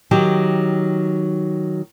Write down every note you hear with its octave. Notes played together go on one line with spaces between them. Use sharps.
D#3 F#3 G4